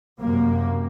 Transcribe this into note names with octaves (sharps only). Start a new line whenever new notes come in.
F#2 C3 A#3